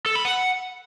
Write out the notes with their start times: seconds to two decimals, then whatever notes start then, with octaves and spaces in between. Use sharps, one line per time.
0.06 A4
0.15 B5
0.25 F#5